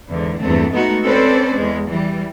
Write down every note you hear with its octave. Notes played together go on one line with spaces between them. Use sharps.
E2 G#2 D3
E2 G2 A3 C4
G#3 A3 B3 D#4 F#4
C4 C#4 A4 B4 C5 D5
E2 G#3
E3 G3